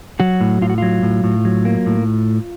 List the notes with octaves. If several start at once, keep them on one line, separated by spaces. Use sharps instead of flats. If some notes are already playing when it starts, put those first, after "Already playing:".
F#3 F#4
A2
A2 F4
F#4
F#3 F4
A2
A2
F#3
A#3
A2